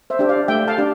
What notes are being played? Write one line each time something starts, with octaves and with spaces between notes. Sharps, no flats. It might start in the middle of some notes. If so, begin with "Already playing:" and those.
C5 E5
D4 G4
D5 F5
A3 E5 G5
F5 A5
D4 G4